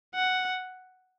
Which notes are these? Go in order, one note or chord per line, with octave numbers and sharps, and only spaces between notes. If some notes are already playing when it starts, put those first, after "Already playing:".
F#5